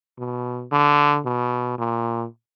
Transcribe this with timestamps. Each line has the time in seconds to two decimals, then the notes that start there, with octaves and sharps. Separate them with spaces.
0.18 B2
0.72 D3
1.25 B2
1.78 A#2